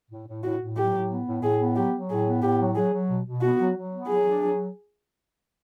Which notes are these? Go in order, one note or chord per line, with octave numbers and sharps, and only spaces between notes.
A2
A2
A2 F#4
A2
F#3 G4
A2
B3
A2
A2 G#4
B3
F#3 G4
F#3
A2 G#4
B3
A2 G4
F#3
F#3 G#4
F#3
B2
B2
B3 F#4
F#3
F#3
B3
F#3 G#4
D4
F#3